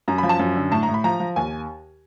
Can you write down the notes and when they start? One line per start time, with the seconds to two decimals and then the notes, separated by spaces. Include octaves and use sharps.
0.08 F#2 A#5
0.18 B5
0.23 F3
0.29 A5
0.39 F#2
0.55 D3
0.71 A2 A5
0.83 A#5
0.88 A2
0.94 B5
1.04 F3 A#5
1.20 F3
1.36 D#2 G#5